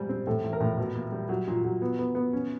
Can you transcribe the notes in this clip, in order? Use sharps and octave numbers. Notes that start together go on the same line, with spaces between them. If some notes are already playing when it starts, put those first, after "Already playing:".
Already playing: G#2 G3
C4
A2 A4
A1
A#4
A2
B2
A#3
G3
F#3
A#2
F#3
B3
B3
B3
C#4